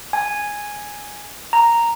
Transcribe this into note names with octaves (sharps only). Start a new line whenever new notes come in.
G#5
A#5